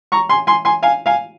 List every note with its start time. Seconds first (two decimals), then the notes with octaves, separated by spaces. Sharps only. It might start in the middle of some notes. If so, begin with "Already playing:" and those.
0.12 A#5 C#6
0.29 G#5 C6
0.47 G#5 C6
0.65 G#5 C6
0.83 F5 G#5
1.06 F5 G#5